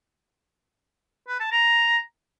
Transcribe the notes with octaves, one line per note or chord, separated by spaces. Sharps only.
B4
A5
A#5